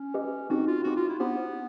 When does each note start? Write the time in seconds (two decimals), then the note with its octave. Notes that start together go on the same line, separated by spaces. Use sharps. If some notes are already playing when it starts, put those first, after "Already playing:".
Already playing: C#4
0.14 G4 B4 D#5
0.50 C4 D#4 F#4 G4
0.67 F4
0.84 C4 D#4 F#4 G4
0.97 F4
1.09 E4
1.20 B3 D4 G4 C5